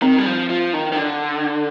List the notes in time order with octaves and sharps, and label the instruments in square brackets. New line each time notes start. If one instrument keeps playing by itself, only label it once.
[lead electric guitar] D#3 [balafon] C4
[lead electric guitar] G3
F3
F3
D#3
D#3
D3